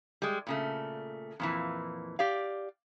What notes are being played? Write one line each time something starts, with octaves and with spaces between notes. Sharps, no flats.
G3 G#3
A#2 C#3 A3
F2 A#2 E3
G4 D5 F5